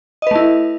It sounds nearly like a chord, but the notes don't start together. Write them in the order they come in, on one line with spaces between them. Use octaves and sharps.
D#5 B4 A3 E4